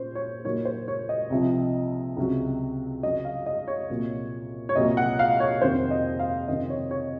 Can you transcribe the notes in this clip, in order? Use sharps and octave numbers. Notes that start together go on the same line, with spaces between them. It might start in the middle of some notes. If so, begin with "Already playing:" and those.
Already playing: A#2 C#4 C5
C#5
A#2 F#3 A#3 D#4 C#5
C5
C#5
D#5
C2 C3 F3
C#2 C3 F#3
F#2 C#3 F#3 D#5
F5
D#5
C#5
C2 A#2 F#3
C#5
C2 A#2 F#3 D#5
F#5
F5
C#5
F2 C3 D#3 C5
D#5
F5
F2 C3 D#3 D#5
C#5
C#5